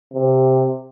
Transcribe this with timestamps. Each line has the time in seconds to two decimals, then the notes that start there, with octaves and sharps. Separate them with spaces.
0.14 C3